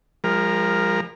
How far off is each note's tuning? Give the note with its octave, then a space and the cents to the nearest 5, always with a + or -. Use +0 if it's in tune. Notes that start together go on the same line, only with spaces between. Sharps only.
F3 +0 G#3 -45 A#4 +0